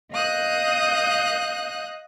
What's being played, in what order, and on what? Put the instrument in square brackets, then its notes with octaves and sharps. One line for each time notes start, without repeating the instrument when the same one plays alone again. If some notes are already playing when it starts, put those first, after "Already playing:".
[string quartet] D#5 F5 D#6 F#6 G6